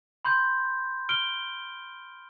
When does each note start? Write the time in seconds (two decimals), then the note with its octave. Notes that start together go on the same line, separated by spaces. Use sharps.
0.25 B5 C6 G6
1.09 F6 D7 G7